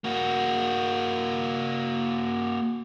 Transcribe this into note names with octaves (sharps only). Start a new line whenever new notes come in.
A#3 F#4